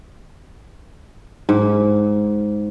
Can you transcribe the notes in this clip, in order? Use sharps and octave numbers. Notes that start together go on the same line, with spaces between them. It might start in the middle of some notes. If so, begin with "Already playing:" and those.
G#2